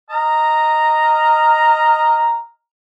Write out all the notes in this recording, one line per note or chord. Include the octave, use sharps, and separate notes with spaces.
D#5 A#5 F6